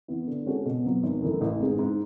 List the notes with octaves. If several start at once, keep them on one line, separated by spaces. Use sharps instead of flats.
E3 B3 E4
D3
G#3 C#4 F#4 A4
B2
F#3 B3
G#1
F#2 E3 A3
A1
G#2 G#3
G#2